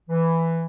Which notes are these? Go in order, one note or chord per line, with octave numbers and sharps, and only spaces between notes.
E3